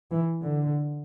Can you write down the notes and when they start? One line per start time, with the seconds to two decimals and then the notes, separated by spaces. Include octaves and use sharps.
0.12 E3
0.42 D3